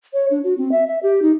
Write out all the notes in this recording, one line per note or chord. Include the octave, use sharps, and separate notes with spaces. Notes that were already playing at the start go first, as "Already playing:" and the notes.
C#5
D4
F#4
C4
E5
E5
G4
D#4